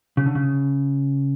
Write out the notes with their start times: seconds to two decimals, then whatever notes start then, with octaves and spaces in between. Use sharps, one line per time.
0.17 C#3
0.26 D3
0.35 C#3